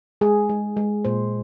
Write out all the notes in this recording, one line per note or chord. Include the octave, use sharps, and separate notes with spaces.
G#3 G#4
G#3
G#3
A#2 C5